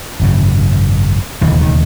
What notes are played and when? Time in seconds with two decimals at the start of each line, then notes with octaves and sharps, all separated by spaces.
0.20 G#1 F#2 C#3
1.41 E1 D#2 C#3 E3
1.61 D#3